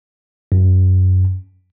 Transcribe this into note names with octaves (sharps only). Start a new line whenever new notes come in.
F#2